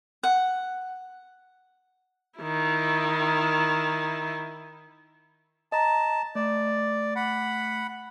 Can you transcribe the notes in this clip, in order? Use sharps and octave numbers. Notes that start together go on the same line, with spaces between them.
F#5
D#3 E4
D#5 A5 A#5
A3 D5
F#5 B5